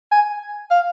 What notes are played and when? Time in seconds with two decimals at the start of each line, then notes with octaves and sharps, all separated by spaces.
0.12 G#5
0.71 F5